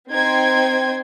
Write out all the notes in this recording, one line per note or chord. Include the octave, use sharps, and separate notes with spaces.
C4 D#4 C5 G5 G#6